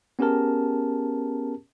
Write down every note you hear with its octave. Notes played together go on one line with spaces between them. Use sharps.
B3 C#4 G4 G#4 A#4 A5